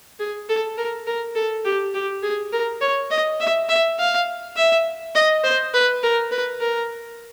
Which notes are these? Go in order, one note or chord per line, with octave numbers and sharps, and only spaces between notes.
G#4
A4
A#4
A#4
A4
G4
G4
G#4
A#4
C#5
D#5
E5
E5
F5
E5
D#5
C5
B4
A#4
B4
A#4